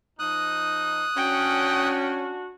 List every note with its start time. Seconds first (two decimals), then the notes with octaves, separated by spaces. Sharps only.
0.19 F3 D#4 D#6 F#6
1.17 C#4 D4 F#4 G5